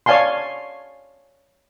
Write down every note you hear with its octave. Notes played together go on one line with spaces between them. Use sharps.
C#5 D5 F5 G#5 A5 C6